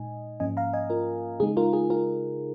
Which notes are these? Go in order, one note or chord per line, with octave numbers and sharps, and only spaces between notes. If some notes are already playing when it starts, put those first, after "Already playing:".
Already playing: A#2 G#3 D#4 D#5 G#5
G#2 F3 A#3 C#4 D#5 G#5
F5 A#5
D#5 G#5
F4 A#4
C#3 G#3 D#4 G#4
F4 A#4
G#4
F4 A#4